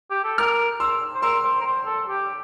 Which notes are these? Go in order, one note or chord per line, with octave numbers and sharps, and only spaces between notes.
G4
A4
A#4 D6 F6
C6 E6
C5
A#4 C6 E6
C5
A#4
C5
A4
G4